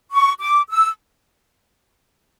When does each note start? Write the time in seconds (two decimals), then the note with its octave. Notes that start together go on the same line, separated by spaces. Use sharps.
0.12 C#6
0.40 D6
0.68 E6